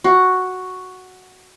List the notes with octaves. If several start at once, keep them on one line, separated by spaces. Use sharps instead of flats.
F#4